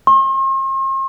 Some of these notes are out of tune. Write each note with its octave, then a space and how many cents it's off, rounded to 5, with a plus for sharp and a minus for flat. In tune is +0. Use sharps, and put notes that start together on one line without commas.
C6 +45